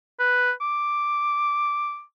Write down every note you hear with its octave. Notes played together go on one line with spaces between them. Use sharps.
B4
D6